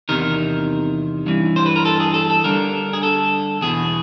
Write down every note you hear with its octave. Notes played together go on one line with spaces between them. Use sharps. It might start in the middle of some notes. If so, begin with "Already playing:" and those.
E2 C3 D#3 A#4
G2 E3
C5
B4
A#4
A4
G#4
A4
A4
G2 D3 A#4
G#4
A4
E2 B2 G#4